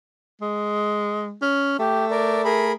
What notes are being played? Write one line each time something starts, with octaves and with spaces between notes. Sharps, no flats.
G#3
C#4
A3 G4
A#4 D5
G#4 A#4 B5